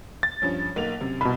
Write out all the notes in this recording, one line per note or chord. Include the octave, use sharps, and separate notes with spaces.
A6
G2 F3 C#4
B1 A#3 F7
F#2 C3
C2 B2 B5